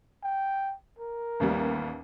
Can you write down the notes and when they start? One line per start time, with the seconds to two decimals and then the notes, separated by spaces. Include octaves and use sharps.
0.23 G5
0.99 A#4
1.40 A1 D#2 G3